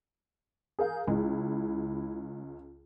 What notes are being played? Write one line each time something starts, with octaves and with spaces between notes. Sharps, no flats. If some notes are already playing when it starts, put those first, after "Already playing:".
G#4 A#4 F5 G6
C#2 G#3 E4